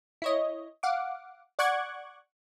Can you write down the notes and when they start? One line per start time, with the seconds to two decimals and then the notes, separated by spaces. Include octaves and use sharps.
0.22 E4 C#5 D#5
0.83 F5 F#5 D6
1.59 D5 F#5 C#6 D6 F#6 G#6